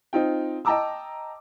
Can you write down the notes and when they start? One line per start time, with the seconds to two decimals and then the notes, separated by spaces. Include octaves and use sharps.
0.13 C4 D#4 F4 G5
0.65 D#5 G5 A5 A#5 D6 E6